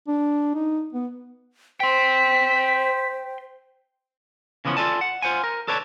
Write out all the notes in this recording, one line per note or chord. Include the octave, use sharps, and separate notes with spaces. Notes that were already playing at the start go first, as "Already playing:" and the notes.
D4
D#4
B3
C5 G5 C6 B6
C#3 E3 F3 B3 C#4
F4 A4 D5 G#5 A5
F#5
F4 C5 F#5 G#5
A#4
A4 B4 C#5 D5 A5